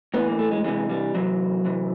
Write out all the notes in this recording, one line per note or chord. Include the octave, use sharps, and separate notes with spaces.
A2 E3 B3
A#3
A3
G#3
C3 E3 G#3
G3
C3 E3 F#3
C3 E3